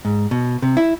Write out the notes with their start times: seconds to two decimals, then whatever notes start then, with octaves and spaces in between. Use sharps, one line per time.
0.05 G#2
0.31 B2
0.62 C3
0.77 E4